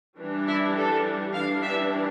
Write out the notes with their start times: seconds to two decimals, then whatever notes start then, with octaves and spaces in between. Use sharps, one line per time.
0.19 E3 G3 D4
0.47 E4
0.76 A4
1.33 E3 G3 D4 F5
1.62 E5